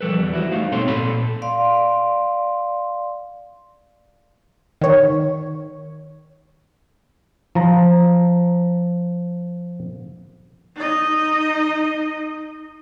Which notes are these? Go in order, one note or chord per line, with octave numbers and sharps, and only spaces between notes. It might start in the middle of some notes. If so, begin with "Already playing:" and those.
F3 G3 A4 B4
E2 G3
E4 F#4 C5
A3 D#4 F5
G#2 B2 C4 A4 C#5 C6
A#2 A4 B5 C6
D5 F5 C6
D#3 C#5
F3 A#5
D#4 D#5